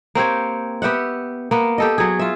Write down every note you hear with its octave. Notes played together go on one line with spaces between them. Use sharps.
A#3 C4 G4 C#5
B3 G4 E5 F#5
A#3 B3
G4 A4 D#5
F#3 G#4
F4 E5